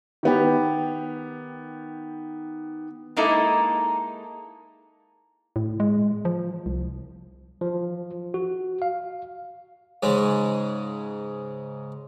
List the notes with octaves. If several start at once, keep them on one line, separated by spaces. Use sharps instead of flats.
D#3 B3 G4
G#3 A#3 D#4 E4 A4
A2
G#3
F3
C2
F3
F#4
F5
G#2 C#3 G#3